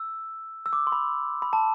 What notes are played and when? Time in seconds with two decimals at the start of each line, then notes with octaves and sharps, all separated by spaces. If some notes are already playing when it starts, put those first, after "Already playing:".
Already playing: E6
0.66 E6
0.73 D6
0.87 C6
0.92 B5
1.42 B5
1.53 A5